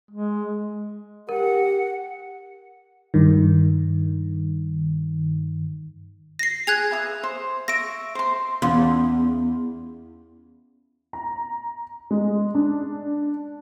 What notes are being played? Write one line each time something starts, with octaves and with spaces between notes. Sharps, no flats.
G#3
G4 A#4 F#5
G2 D#3
A#6 C7
G#4 F#6 G#6 F7
B4 E5 D#6
C5
E5 C#6 A#6 D7
C5 C6
E2 C#4 F5 C6
A#5
G#3
D4